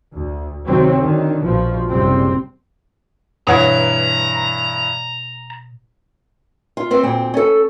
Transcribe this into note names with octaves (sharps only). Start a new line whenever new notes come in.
D2
C3 D#3 F#3 C4
D3 D#3
A#1 B2 F3
F#1 C3 G3 C4
G2 B2 E3 C#5 F#5 A#5 G#6
F4
B3 C4 C5
D2 A#2 C4 G5
C#4 A4